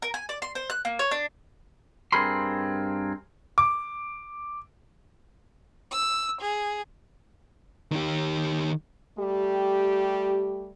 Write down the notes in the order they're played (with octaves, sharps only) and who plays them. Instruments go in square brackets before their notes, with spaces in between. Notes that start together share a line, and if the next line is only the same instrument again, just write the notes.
[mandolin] A#4
G#5
D5
C6
C5
F#6
A#3
C#5
D4
[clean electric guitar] G2 C4 G#4 A#4 B5 C6
[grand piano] D6
[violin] E6
G#4
[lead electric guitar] D#3 G4
[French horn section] G3 A3 G4